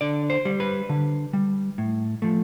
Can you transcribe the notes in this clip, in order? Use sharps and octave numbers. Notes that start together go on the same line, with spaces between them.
D3 D5
C5
G3
B4
D3
G3
A2
F3 A3